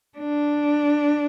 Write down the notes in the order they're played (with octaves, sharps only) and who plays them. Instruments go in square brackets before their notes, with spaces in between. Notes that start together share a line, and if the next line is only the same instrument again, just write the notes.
[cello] D4